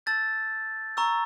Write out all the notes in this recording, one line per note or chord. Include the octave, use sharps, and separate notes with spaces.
A5 E6 G6 A6
A#5 C#6 E6